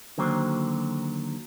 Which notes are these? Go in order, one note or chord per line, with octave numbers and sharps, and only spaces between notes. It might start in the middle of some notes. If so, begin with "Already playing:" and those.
D3 D#3 F#3 A#3 C5